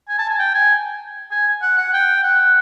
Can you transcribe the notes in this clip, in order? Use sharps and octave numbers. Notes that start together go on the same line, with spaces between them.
G#5
A5
G#5
G5
G#5
G#5
F#5
F#5
G5
F#5